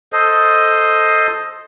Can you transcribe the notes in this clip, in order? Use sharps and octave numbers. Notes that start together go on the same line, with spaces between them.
A4 C5 D#5